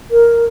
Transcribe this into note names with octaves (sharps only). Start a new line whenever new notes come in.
A#4